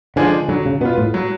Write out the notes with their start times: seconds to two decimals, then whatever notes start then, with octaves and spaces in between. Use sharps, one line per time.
0.16 D3 F3 G#3 D4 G#4
0.48 D3 F#3
0.66 C#3
0.81 B2 B3 F4
0.98 A2
1.14 F#3